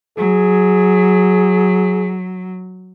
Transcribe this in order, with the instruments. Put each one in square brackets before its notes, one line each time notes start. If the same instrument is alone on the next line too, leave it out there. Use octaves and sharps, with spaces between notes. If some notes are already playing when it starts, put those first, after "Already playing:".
[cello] F#3 [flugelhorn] G#4